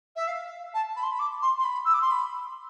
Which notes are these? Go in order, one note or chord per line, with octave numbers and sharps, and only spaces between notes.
E5
F5
A5
B5
C6
B5
D6
C6
C6
B5
E6
D6
C6
B5